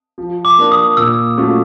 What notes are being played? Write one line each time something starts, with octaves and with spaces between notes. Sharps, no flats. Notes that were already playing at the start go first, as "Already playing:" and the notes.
F3
D6
A#3 D4
D#6
A#2 E6
F#3 A3 C#4 F4